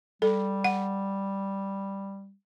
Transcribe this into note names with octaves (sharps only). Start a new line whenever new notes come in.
G3 A4
F#5